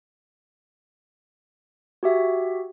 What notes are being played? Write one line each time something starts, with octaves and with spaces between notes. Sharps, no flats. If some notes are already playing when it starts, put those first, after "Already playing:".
F#4 G4 E5